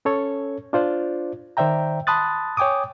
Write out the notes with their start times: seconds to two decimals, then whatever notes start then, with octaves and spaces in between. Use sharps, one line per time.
0.05 C#4 A4 C#5
0.73 D4 F4 C5 D5
1.57 D#3 C5 D5 E5 G5 A#5
2.07 A5 B5 C6 D#6 F#6 A6
2.57 C#5 G5 G#5 D6 D#6